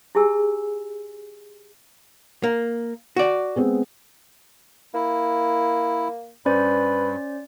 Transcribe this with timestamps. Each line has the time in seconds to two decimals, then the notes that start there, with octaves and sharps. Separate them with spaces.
0.15 E4 G4 G#4 G#5 E6
2.44 A#3
3.16 F#4 D5
3.56 G#3 B3 C4
4.94 A#3 E4
6.46 G2 C#4 B4 C5 D5